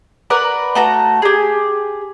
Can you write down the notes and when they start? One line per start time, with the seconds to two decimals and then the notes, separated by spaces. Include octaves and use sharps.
0.30 A#4 B4 D5 F#5
0.75 A3 F#4 A#5
1.22 G4 G#4